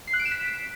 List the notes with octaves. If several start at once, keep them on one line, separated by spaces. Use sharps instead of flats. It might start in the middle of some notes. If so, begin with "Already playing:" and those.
C7
F#6
D7
E7
B6